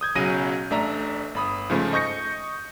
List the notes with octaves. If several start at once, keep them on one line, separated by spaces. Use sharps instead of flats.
D#6 G6 G#6
B1 C#3 F#3 C#4 A#6 D#7
A1 A3 D4 D5 E5 A#5
G1 B5 D#6
G#2 C#3 F3 A3 C#4
D#5 C#6 G6 A#6 C#7